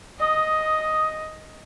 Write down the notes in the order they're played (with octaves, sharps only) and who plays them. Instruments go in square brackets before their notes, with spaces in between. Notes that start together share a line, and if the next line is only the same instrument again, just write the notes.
[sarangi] D#5 [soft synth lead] D#6